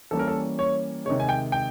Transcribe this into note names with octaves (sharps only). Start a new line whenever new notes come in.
E3 G3 A#3 C#4 A4
A#4
A4
C#5
C3 D#3 G#3 C#5
G#5
G5
G5